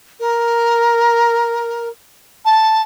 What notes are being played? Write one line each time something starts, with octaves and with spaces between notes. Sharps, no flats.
A#4
A5